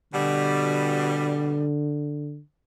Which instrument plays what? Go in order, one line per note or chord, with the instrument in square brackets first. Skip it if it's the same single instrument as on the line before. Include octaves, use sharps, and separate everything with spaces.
[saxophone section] B2 G3 [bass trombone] D3